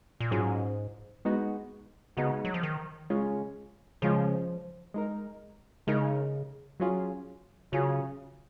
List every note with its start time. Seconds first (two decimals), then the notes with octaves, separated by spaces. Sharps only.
0.20 A#2
0.31 G#2 F#3 C#4 F4 G#4
1.25 G#3 B3 D#4 F#4
2.17 C#3 G#3 B3 D#4 F#4
2.45 F#3
2.54 F3
2.63 D#3
3.10 C#3 G#3 C#4 F4
4.02 C#3 F3 G#3 C#4 F4
4.94 G#3 D#4 A#4
5.87 C#3 G#3 D#4 A#4
6.80 F#3 C#4 F4 G#4
7.72 C#3 F#3 C#4 F4 G#4